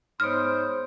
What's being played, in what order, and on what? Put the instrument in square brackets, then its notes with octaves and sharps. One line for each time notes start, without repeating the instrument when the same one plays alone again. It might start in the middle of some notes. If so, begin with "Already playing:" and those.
[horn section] G#2 C5 C6 [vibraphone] B3 C#5 D#6 [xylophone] F6